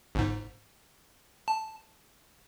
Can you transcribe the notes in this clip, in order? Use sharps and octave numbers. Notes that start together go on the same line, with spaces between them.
G1 G#2
A5